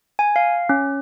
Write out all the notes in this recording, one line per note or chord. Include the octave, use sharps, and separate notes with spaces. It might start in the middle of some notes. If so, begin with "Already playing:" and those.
G#5
F5
C#4